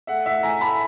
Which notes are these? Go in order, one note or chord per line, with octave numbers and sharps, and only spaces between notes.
A3 E5 F#5
A2 E5 F#5
A2 G#5 A#5
A3 A5 B5